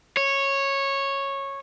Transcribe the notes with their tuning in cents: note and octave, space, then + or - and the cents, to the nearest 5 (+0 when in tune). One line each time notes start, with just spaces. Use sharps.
C#5 -10